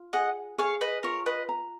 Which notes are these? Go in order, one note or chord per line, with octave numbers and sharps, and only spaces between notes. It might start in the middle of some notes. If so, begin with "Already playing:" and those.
Already playing: F4
G#4 D#5 F#5
G#4 C#5 F5
B4 D#5
F4 A#4 C#5
B4 D#5
A#5